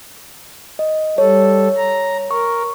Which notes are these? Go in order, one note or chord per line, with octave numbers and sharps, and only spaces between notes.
D#5
G3 A4 C#5
A#5
A#4 C#6